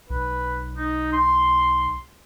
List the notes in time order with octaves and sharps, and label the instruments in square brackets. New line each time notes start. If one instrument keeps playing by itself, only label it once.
[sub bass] B1 [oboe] B4
[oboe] D#4
C6